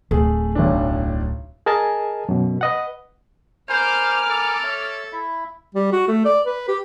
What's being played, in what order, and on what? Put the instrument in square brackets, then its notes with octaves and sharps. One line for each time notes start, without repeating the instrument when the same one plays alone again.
[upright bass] D1 [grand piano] A3 G#4
[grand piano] B1 A2 D4
[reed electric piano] G#4 A#4 D#5 G#5 A5
F#2 B2
B4 D#5 F#5
[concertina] A#4 G#5 B5 [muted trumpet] C5 [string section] D6 F6
[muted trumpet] A4
[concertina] C#5 E5
E4 E5
[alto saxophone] G3
F#4
A3
D5
B4
G4